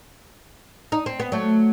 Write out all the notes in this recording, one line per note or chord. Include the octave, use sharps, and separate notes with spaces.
D#4
C4
B3
F#3 A3